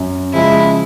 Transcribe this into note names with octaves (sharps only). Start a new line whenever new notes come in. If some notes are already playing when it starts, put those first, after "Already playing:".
Already playing: F#2
C#3 F3 G#3 E4